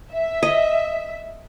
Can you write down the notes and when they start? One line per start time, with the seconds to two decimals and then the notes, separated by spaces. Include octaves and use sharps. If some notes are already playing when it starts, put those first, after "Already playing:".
0.12 E5
0.43 D#5